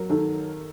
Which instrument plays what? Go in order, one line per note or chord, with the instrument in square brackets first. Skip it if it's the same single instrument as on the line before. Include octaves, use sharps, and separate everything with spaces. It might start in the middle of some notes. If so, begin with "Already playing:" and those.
Already playing: [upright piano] F#3 [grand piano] A#4
[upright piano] D#3 [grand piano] A4